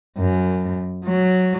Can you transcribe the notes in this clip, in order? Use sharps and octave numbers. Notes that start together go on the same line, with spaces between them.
F#2
F#3